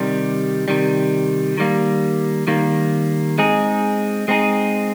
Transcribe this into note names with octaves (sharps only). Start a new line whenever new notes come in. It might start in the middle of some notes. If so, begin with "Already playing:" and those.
Already playing: C3 D#3 G3
C3 D#3 G3
D#3 G3 A#3
D#3 G3 A#3
G#3 C4 D#4 G#4
G#3 C4 D#4 G#4